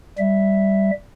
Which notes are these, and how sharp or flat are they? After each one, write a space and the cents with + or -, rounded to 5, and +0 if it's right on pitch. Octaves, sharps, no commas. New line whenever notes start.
G3 +0 E5 +0